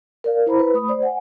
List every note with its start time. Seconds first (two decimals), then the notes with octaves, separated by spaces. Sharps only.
0.24 A#4 D5 F5
0.46 E4 C5 A#5 B5
0.59 B4
0.74 A3 B5 D#6
0.88 C5 D5
1.03 F#5 G#5